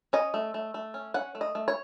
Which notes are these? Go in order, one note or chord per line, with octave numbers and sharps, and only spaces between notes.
C#4 D#5
A3
A3
A3
C#4
C#4 F#5
A3
D#5
A3
C#5